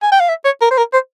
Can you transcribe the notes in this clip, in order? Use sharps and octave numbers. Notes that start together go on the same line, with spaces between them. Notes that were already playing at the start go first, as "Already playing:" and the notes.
G#5
G5
F5
E5
C#5
A#4
C5
A#4
C5